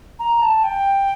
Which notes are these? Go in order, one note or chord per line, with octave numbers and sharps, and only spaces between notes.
A#5
A5
G5